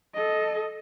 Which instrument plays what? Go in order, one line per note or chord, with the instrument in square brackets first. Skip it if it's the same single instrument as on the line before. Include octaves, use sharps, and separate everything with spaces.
[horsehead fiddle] A4 D#5